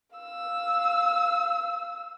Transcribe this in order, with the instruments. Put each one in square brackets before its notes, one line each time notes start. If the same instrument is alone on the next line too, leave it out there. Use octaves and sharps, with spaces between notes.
[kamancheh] F5 E6